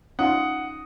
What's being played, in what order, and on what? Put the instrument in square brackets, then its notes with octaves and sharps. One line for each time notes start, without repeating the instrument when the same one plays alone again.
[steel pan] C#4 D#4 F4 [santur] D#5 [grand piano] F#5